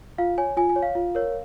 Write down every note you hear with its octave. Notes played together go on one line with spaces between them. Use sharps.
F4 F5
C#5 G#5
F4 G#5
G#5
C#5
F5
F4
A#4 C#5